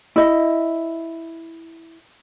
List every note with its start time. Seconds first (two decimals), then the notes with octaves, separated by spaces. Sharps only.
0.16 E4 D#5